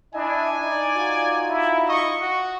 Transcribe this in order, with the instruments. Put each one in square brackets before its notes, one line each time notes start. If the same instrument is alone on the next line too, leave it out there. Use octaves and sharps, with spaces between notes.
[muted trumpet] D4 [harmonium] E4 D#5 E5 [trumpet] G#5
[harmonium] D#4 [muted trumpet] D5
[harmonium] D#4 F4 F#4
[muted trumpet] E4
[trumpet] D#5 [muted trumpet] C#6
[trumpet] F#4